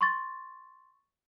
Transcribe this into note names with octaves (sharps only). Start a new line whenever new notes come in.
C6 C#6 A6